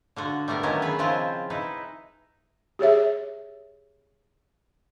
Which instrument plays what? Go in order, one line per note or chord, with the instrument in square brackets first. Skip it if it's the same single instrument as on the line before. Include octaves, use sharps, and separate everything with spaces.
[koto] D3 F4 F#4
G3 A3 B3 A#4
D#3 F#3 B3 C#4 E4 F4
B3 G#4 B4
C#3 F3 C4 E4 F4
D#4 E4 B4
[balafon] G4 G#4 C#5 E5